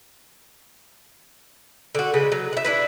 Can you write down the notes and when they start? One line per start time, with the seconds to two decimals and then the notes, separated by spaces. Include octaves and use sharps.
1.95 D3 F#4
2.14 C#3 G#3 B4
2.32 F#3
2.53 E5 F#5
2.64 D4 E4 B4